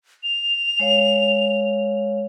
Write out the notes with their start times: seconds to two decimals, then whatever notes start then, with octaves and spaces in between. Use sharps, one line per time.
0.23 F7
0.80 G#3 C#5 F5